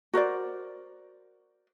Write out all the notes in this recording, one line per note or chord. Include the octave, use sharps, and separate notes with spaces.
F#4 A#4 C5 D5